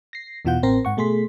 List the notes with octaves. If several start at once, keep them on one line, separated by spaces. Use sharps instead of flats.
A#6 C7
E2 B2 E3 F4 F#5 G6
A1 C4 A#4 C6 A#6
G#2 F#5 C#6
B2 A3 G#4 C6 B6